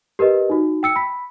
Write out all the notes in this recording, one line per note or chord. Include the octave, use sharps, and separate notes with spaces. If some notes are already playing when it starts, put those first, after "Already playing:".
G4 A#4 B4 D#5
D#4 F#4
G5 E6 C#7
B5 B6